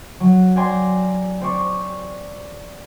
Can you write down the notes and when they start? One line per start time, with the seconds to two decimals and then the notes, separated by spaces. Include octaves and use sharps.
0.20 F#3
0.56 D5 G5 G#5 A#5 C6
1.41 C4 D5 C#6